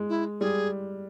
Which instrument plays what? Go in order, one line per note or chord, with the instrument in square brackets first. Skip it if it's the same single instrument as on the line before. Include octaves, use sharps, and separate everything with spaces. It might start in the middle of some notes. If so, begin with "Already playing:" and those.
Already playing: [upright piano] G#3
[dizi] E4
[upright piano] G3 [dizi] G#4